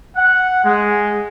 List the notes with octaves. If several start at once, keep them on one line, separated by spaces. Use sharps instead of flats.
F#5
G#3